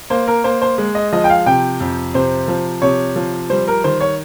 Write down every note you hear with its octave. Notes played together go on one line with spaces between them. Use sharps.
A#3 C5
A#4
A#3 C5
C5
G#3
D#5
F3 D#5
G5
F5
C3 G5
F2
C3 C5
F3
C3 C#5
F3
G3 C5
A#4
D#3 C5
C#5